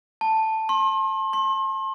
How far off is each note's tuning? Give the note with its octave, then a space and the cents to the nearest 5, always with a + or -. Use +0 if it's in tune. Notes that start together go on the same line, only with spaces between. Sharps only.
A5 +5
C6 +40
C6 +40